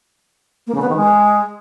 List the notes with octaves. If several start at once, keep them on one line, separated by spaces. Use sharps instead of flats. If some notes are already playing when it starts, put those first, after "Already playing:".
A#3
C#3
B3
D#3
G#3